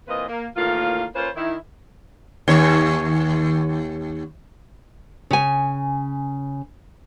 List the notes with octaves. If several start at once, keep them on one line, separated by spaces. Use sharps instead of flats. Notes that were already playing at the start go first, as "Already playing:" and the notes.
A#2 E3 A#3 C4 B4 D#5
A#3
D#2 A2 E3 A#3 F4
A#3 C#4 F4 B4 C5
D#3 E4
D#2 C#5
C#3 G#5